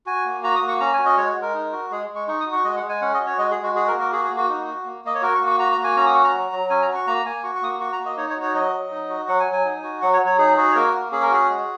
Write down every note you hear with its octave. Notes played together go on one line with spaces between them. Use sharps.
F#4 G#5
A#3
F#4 A#5
D#6
A#3
C#6
C#4 A#5
G#5
F#4
D#5
G#3 C#5
G#3
A#4
D#4
F#4
G#3 G#4
G#3
C#6
D#4 C#6
D#6
F#4
C#6
G#3 D#5
F#5
G#3
G#5
C#4 F#5
D#5
F#4
C#5
G#3 D#5
G#4
G#3
F#4
F#4 G#4
A#4
A#3
A#4
F#4 G#4
G#4
A#3
F#4
D#4
F#4
A#3
A#3 D#5
C#5
F#4 A#4
C#6
A#3
C#6
F#4 A#5
A#5
A#3
G#5
C#4 A#5
D#6
F#4 C#6
A#5
F#3
F#3
C#4 G#5
A#5
F#4
C#6
A#3 A#5
A#3 G#5
F#4 C#6
C#6
A#3 D#6
C#6
F#4 C#6
A#5
A#3
D#5
D#4 C#5
C#5
F#4
C#5
F#3 D#5
F#3
D#4
F#4
F#3 F#5
G#5
F#3
G#5
D#4
F#4
F#3 F#5
C#5
F#3
C#5
D#4 G#4
F#4 G#4
C#5
A#3 A#4
A#3
C#4 G#4
A#4
F#4 G#4
G#3